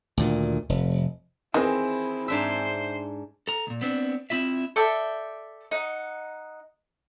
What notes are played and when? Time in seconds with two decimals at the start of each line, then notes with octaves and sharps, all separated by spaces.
0.17 D2 A#2 D#3
0.69 F1
1.54 D#3 E3 C4 E4 G#4 D#5
2.28 G#2 D4 C5 E5
3.48 A4 A#5
3.67 D2 A#2
3.81 B3 C4 D4
4.30 C4 E4 F4 E5
4.76 A4 D5 E5 G5
5.71 D#4 F#5